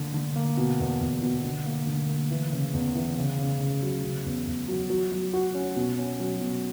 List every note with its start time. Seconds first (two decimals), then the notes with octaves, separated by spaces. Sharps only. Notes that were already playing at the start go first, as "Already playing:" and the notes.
Already playing: D3 A#3
0.14 D3
0.36 A#3
0.57 B2
0.80 E2
1.01 E2
1.22 B2
1.44 D3
1.66 A#3
1.87 D3
2.09 A#3
2.30 E3
2.52 C#3
2.74 E2
2.95 E3
3.17 C#3
3.39 C#3
3.60 C#3
3.82 F#3
4.03 C#3
4.25 E2
4.47 E2
4.68 F#3
4.90 F#3
5.12 F#3
5.33 F#4
5.54 C#4
5.76 B2
5.98 C#4
6.20 F#3
6.41 B2